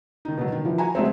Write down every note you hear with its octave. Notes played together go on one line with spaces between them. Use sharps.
D#3 D#4
B2 D#3 F#3
D#3
E3 F3
F#4 G#5 A#5
F#3 G#3 A3 C4